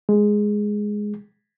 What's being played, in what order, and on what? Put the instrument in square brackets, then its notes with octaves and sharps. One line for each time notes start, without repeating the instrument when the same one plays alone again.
[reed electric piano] G#3